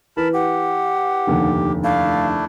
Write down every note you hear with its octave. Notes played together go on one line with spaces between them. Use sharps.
E3 A#4 A5 B5
G4 F#5
F1 D#2 D3
A3 D4 E4 F5